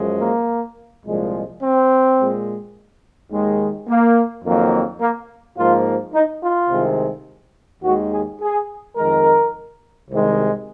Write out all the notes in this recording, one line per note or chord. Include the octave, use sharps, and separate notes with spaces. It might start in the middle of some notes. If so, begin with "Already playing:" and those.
Already playing: F#2 F3 G#3
A#3
C2 A#2 F3 G#3
C4
A#2 G#3
D#2 D#3 G#3
A#3
F2 D#3 F#3 A#3
A#3
G#2 F3 A#3 F4
D#4
F4
C2 C3 D#3 G#3
D#2 D#3 G#3 F#4
G#4
G#4
F2 D#3 G#3 A#4
C2 C3 D#3 G#3